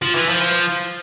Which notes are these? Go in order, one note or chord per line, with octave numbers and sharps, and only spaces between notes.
F3
E3
F3